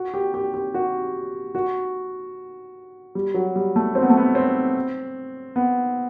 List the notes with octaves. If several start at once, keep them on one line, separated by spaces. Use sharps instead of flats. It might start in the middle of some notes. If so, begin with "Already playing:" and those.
Already playing: F#4
G4
G4
G4
F#4
F#4
G3
F#3
G3
A3
C4
B3
A3
B3
C4
B3